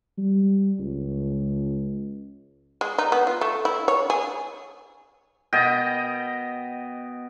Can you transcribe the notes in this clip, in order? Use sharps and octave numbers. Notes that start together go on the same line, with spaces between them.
G3
C#2
G#3
D#4
B3
F4
A3
E4
C#5
G#4
B2 D#5 G5